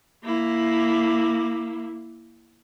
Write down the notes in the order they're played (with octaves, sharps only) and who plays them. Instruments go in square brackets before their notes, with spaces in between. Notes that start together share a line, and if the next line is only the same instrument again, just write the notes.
[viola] A#3 E4